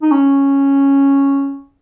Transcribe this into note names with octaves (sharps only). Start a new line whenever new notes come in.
D#4
C#4